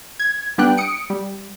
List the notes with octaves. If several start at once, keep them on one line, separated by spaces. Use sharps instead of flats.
G#6
G3 B3 D4 G5 F#6
D#6 C#7 D7
G3